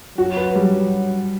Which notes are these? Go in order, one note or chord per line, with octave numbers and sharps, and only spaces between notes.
F#3 F#4
B4
G3